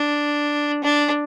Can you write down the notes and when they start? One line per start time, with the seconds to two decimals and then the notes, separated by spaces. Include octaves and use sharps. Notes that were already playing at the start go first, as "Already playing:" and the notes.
Already playing: D4
0.83 D4